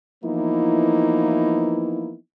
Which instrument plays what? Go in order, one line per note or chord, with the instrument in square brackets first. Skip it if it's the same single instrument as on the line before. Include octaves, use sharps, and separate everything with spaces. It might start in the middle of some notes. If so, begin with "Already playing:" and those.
[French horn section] E3 F3 A#3 B3 D#4 E4